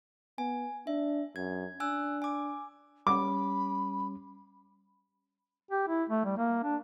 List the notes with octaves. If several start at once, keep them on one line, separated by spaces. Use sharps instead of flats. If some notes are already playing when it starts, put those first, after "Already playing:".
B3 G#5
D4 E5
F#2 G#6
D4 G#5 E6 F#6
G#5 D6
G3 C#4 B5 D6
G4
E4
A3
G3
A#3
D4